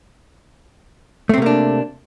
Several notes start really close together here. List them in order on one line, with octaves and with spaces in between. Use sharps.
A3 C4 C3 A#3 D4